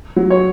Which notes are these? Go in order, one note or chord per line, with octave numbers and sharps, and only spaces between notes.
F#3
C#5